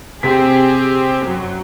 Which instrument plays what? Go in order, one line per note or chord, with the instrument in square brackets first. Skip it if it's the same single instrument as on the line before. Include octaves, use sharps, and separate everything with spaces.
[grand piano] C3 B6 [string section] C4 G4 G#4
[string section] F#2 F#3